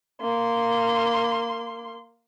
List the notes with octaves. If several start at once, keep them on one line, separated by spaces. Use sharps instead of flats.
A#3 C6